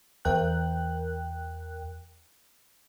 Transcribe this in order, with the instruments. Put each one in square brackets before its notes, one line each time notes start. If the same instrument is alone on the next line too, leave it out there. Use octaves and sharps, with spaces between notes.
[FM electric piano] E2 A#4 G5 F#6